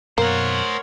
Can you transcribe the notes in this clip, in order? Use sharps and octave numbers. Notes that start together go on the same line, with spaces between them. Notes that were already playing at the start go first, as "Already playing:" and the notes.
F#2 B2 A#3 A#4 C5 C#5 F#5